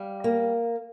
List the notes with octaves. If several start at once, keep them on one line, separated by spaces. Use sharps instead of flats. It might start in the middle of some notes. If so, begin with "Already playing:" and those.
Already playing: G3 F5
A#3